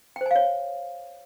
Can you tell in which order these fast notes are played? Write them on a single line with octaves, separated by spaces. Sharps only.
G5 C5 G#5 F5 C#5